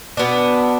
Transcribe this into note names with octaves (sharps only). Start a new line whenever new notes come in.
B2 B3 D4